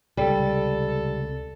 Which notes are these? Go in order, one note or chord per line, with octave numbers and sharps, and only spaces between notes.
C#2 C3 G3 A4